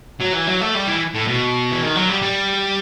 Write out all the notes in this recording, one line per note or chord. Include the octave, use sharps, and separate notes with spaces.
F#3
E3
F#3
A3
G3
E3
A2
B2
E3
D#3
F#3
G3
G3